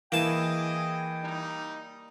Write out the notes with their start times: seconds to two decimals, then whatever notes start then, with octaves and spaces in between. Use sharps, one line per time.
0.12 E3 A#3 E4 G#4 D#5 G5 A5 D#7
1.23 G3 D#4